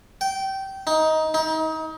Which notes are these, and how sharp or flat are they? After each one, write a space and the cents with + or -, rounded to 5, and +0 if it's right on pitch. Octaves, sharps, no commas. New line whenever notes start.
G5 -20
D#4 +15
D#4 +30